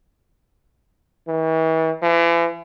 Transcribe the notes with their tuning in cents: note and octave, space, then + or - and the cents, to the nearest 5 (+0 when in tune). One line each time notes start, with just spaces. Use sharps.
E3 -40
E3 +40